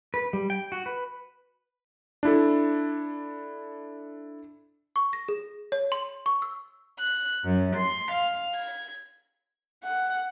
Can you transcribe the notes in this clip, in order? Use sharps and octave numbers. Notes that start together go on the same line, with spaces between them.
B4
G3
G5
F#4
B4
D4 E4 A4
C#6
A#6
G#4
C#5
C6
C#6
E6
F#6
F#2
C6
F5
G#6
F#5